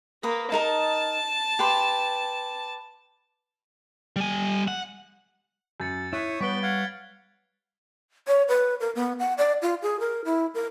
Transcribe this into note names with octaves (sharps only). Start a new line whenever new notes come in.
A#3 B4 D#6
D#4 A#4 D#5 A5
G4 B4 C6
G3 G#5
F#5
F#2 G6 A6 C#7
E4 C#5 E5 D#6 F#6 B6
G3 B3 B4 C#5 C#6 B6 D7 G7
F5 F#5 G#6
C#5
B4
A#4
B3
F#5
D5
F4
G#4
A#4
E4
A#4